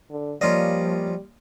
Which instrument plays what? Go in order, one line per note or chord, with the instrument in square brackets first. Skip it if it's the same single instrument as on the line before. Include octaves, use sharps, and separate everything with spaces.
[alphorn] D3
[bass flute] F3 [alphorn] G3 [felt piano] A#3 D5 [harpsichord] C#4 F4 D#5